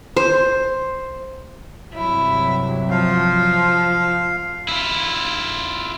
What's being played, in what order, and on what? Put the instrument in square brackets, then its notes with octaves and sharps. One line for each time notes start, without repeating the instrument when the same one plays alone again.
[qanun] C5
[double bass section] G2 C3 F#3 [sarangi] E4
[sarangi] F3 [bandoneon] F5
[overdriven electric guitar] E4 F4